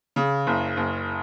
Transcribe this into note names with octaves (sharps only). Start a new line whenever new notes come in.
C#3
F#1
F#1